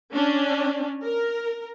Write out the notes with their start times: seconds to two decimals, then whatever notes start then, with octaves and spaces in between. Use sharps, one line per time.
0.14 C#4 D4
1.03 A#4